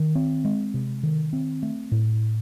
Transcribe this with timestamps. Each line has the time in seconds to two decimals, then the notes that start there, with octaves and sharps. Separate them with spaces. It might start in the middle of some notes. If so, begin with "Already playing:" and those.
Already playing: D#3
0.15 C4
0.45 G#3
0.74 C3
1.03 D#3
1.33 C4
1.63 A3
1.92 A2